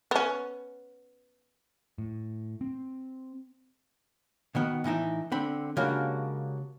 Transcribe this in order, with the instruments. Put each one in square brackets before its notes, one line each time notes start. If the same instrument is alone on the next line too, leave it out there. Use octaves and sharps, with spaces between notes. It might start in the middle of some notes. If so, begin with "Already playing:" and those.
[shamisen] B3 C#4
[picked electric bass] A2
C4
[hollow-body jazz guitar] B2 D#3 B3
A2 E3 D#4 E4
D3 C4 B5
C#3 G#3 A#3 D4 F#4 G4